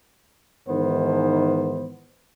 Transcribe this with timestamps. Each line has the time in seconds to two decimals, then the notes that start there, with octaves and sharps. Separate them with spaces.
0.67 G#2 D#3 E3 B3 C5